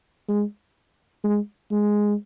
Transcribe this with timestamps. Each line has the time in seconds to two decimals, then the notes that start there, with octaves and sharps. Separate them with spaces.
0.29 G#3
1.24 G#3
1.71 G#3